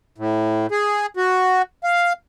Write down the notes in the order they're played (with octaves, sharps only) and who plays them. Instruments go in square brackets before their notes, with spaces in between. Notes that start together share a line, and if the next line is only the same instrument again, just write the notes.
[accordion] A2
G#4
F#4
F5